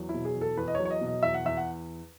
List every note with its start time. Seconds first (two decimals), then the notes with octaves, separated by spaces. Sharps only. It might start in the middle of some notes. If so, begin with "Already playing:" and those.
Already playing: E2 F#3
0.09 E4
0.14 B2
0.25 G#4
0.36 E2
0.41 A4
0.57 E2 B4
0.68 D#5
0.75 C#5
0.79 F#3
0.85 C#5
0.91 D#5
1.01 B2
1.06 D#5
1.23 E2 E5
1.34 F#5
1.45 E2 E5
1.57 F#5